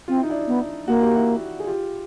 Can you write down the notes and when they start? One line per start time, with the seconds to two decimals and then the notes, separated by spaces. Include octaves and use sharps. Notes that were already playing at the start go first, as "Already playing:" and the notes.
0.08 C4 F4
0.16 E4
0.23 D#4
0.30 D4 E4
0.48 B3
0.87 A#3 F#4
1.01 G4
1.15 E4 F#4
1.60 G#4
1.67 F4 G4